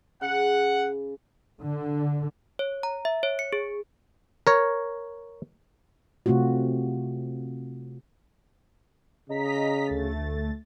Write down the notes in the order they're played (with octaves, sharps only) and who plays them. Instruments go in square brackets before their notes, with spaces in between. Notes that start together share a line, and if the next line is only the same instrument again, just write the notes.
[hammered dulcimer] C#3 [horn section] F#5
[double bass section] D3
[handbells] C#5
A#5
E5
C#5
C#7
G#4
[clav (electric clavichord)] A#4 C#5
[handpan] C3 A3 C4 F4 F#4
[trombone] C#3 [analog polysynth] D#5 A#5 B6
[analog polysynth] D2 A3 A6